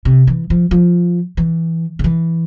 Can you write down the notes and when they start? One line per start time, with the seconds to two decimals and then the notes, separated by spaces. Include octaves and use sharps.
0.05 C3
0.27 E3
0.50 F3
0.71 F3
1.37 E3
1.99 C#3
2.04 E3